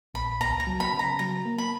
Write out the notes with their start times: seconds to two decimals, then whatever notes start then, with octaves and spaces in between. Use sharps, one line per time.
0.14 A#1 B5
0.41 C#2 A#5
0.60 A#5
0.67 F#3
0.80 B5
0.93 C#3
0.99 A#5
1.19 F#3 A#5
1.45 A#3
1.58 B5